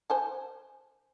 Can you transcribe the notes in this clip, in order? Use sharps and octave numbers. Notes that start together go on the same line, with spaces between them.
C5 G#5 A5